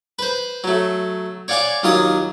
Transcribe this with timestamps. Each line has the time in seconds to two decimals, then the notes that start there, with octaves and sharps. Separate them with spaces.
0.19 B4 C5
0.64 F#3 A3
1.48 C#5 D5 F5 F#5 G#5 D6
1.83 D#2 F#3 F4 C6 D#6